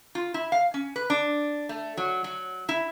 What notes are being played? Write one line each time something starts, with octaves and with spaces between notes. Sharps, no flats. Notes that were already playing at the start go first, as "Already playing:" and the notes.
F4
E4
F5
C#4
B4
D4
A3
F#3
F#3
E4